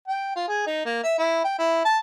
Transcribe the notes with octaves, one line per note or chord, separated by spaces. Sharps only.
G5
F4
G#4
D#4
A#3
E5
E4
G5
E4
A5